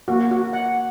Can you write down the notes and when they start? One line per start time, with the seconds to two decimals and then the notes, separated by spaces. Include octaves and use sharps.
0.08 A#3 F#4
0.31 F#4
0.53 F#5